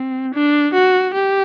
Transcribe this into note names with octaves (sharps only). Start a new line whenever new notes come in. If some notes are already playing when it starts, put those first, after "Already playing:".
Already playing: C4
D4
F#4
G4